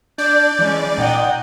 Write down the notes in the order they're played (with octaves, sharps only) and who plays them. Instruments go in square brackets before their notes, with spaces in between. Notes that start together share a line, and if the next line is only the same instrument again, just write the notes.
[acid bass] D4 [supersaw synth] D5 [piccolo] G6
[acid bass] E3 [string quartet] G#3 C#4
[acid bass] A#2 [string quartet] D#4 F#5 D#6 [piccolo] G5